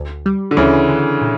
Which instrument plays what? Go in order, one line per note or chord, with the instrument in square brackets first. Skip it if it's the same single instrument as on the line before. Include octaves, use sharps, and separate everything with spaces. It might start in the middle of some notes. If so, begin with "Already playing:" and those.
Already playing: [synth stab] D2
G3
[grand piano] D3
[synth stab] D2 [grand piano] C#3 E3
[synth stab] D3
A#2